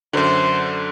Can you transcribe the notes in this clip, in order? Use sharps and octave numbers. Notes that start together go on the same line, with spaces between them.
F#2 D3 C5